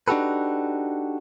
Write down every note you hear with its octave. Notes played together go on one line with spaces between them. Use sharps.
D4 D#4 F#4 G4 A4 B4